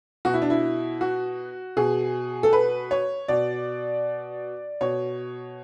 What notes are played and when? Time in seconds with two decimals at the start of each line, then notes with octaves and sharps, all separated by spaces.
0.25 B2 F#4
0.34 E4
0.42 D4
0.50 E4
1.01 F#4
1.77 B2 G#4
2.43 A4
2.53 B4
2.91 C#5
3.28 B2 D5
4.81 B2 C#5